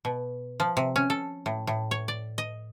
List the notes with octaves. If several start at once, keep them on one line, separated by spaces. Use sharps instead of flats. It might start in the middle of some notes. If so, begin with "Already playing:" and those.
B2
F3
C3
C#4
A4
A2
A2
C#5
D5
D#5